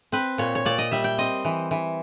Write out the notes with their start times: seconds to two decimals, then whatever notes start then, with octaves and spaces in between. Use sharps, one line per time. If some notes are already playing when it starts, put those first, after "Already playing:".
0.12 C4 B4
0.38 A#2 C#5
0.55 C#5
0.65 A#2 D5
0.78 D#5
0.91 G3 E5
1.04 G5
1.18 C4 D#5
1.45 E3
1.71 E3